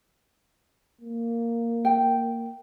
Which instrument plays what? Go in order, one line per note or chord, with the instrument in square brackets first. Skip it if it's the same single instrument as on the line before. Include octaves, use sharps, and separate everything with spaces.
[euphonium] A#3
[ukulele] G5